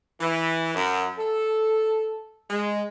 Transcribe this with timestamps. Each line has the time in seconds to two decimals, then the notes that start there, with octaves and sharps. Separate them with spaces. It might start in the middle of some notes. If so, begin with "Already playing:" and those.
0.21 E3
0.75 F#2
1.18 A4
2.50 G#3